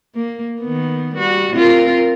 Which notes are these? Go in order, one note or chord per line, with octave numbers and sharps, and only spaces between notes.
A#3
D#3 B3
G3 F#4
C4 F4 A#4